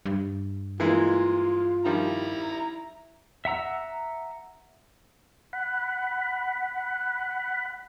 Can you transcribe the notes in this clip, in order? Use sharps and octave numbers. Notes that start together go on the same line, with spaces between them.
G2
E3 G#3 A#3 F4
D#3 F3 G3 E4 A#5
E5 F#5 A#5 E6
F#5 B5